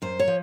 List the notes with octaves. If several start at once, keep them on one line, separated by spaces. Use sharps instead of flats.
F#2 C5
C#5
F3